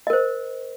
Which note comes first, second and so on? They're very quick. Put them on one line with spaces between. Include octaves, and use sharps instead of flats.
D#5 A#4 C5